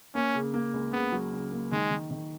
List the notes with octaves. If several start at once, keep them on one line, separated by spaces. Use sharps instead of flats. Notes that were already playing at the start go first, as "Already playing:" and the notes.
A#3 C#4
C#3
A#3
C#2
C#3 B3
F#3
C#3
A#3
D#3 G#3
D#3
D#3